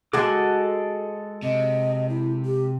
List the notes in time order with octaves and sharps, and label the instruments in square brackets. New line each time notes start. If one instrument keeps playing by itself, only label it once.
[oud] G#3 F#4 G#4 [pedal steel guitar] A4 F#5 D6
[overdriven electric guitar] C3 [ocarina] D#5
[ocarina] E4
G4